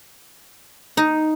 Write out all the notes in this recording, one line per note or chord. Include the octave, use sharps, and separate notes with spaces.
D#4